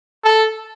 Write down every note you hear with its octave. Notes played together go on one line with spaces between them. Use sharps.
A4